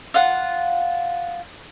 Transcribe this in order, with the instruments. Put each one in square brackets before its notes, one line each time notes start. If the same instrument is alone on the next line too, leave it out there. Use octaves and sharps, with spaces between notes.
[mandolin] F4 F#5